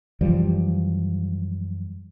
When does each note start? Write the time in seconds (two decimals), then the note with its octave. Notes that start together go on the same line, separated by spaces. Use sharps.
0.21 F#2 E3 F3 G3